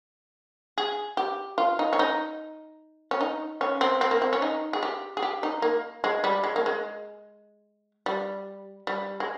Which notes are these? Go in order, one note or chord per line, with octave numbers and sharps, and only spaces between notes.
G#4
G4
F4
D#4
C#4
D#4
C#4
D#4
C#4
C4
C4
A#3
C4
C#4
D#4
G#4
G4
G#4
G4
D#4
A#3
G#3
G3
G#3
A#3
G#3
G3
G3
G#3